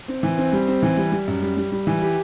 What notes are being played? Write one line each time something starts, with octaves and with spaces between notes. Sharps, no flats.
C4
E3
C4
G3
C4
E3
G3
G3
F#2
G3
G3
G3
E3
G4